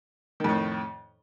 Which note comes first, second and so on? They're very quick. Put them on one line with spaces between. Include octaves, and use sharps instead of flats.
D#3 F2 A2